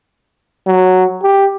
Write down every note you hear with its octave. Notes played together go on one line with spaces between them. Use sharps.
F#3
G4